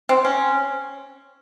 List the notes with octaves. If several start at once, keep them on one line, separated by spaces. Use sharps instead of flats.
C4
C#4